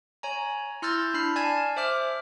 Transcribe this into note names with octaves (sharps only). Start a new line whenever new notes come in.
C#5 G#5 A#5
E4 C6 E6 F6 G6 A6
D4 B5 F6 C7
D5 G#5 A5 G#6
C5 E5 D6 F6